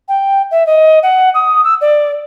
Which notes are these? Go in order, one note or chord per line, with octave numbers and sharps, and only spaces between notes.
G5
E5
D#5
F#5
D#6
E6
D5